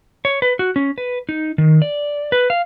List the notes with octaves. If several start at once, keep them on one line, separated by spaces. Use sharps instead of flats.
C#5
B4
F#4
C#4
B4
D#4
D#3
D5
B4
F5